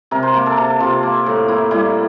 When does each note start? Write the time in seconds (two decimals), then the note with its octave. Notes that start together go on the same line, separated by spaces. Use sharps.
0.11 C3 A#4
0.23 C5
0.33 A#3 A#4
0.46 A4
0.57 C3 A4
0.80 C3 F4
1.03 A#3
1.26 A2
1.48 A#3 E4
1.71 G3 E4